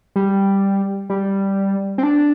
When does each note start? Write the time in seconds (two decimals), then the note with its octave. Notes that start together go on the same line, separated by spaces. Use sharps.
0.16 G3
1.10 G3
1.98 C4
2.03 D4